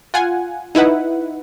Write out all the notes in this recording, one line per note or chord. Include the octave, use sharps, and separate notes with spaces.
F4 F#5 G#5
D#4 E4 B4 F#5